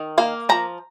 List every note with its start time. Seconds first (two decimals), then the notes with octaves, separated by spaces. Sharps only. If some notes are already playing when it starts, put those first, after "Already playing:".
Already playing: D#3
0.18 A#3 F5
0.49 F3 A#5